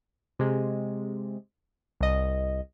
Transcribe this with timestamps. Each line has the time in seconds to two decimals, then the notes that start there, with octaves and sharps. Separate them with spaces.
0.39 C3 G#3
2.01 C2 D#5